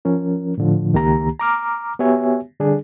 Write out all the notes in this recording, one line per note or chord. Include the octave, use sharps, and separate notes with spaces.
F3 C#4 A#4
A2 D3 F3
C#2 D#3 A#3 G4 A#5
A#5 D6 F6
B3 F#4 G4 C#5 E5 G#5
D3 G3 D4 G#4